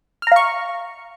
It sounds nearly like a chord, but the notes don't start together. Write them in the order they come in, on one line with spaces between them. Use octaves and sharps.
F6 A#5 F5 C#6